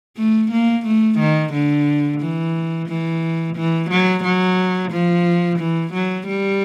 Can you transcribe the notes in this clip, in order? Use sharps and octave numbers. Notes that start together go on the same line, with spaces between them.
A3
A#3
A3
D#3
D3
E3
E3
E3
F#3
F#3
F3
E3
F#3
G3